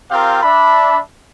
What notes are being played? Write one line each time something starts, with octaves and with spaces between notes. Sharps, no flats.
C4 F4 G4 A#4 F5 G5
D4 E5 B5